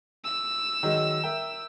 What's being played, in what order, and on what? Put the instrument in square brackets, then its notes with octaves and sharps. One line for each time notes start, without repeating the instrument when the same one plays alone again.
[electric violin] E6
[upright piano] D#3 F#3 G#3
A#4 E5 G5